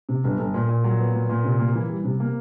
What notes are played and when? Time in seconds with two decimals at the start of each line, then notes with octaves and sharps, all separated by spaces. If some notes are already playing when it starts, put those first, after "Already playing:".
0.09 C3
0.24 G1
0.39 G1
0.54 A#2
0.69 A#2
0.84 F#3
0.99 B3
1.14 A#2
1.29 A#2
1.44 C3
1.59 A#3
1.74 E3
1.89 G3
2.04 C3
2.20 A#3